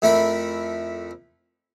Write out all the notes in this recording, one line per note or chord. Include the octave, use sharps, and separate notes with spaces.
F2 A3 E4 A#4 B5